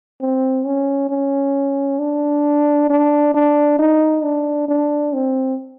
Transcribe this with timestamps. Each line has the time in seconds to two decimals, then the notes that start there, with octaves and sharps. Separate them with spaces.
0.21 C4
0.66 C#4
1.10 C#4
1.99 D4
2.90 D4
3.34 D4
3.79 D#4
4.23 D4
4.68 D4
5.13 C4